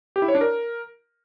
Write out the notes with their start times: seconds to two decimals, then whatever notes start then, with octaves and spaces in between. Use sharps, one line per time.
0.16 G4
0.22 E4
0.28 C#5
0.35 D4
0.41 A#4